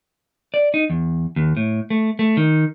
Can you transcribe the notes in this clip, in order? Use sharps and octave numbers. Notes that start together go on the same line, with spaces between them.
D5
D#4
E2
D#2
A2
A3
A3
D#3